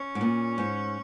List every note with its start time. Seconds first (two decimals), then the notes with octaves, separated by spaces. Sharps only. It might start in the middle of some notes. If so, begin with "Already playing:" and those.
Already playing: C#4
0.15 G#2
0.21 A#2
0.58 G#2